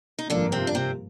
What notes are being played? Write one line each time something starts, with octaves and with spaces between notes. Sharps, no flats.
D#4
G#1 G2 D3 F3 A#3 D4
C3 C4
D4
C3 C4